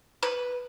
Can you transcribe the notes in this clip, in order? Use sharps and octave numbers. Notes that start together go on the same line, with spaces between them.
B4